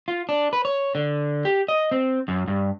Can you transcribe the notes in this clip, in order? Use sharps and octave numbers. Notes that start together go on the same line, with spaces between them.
F4
D4
B4
C#5
D3
G4
D#5
C4
F#2
G2